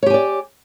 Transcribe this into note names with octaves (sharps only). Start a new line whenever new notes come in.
G4 C#5 D5 G#5